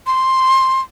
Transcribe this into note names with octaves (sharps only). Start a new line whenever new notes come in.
C6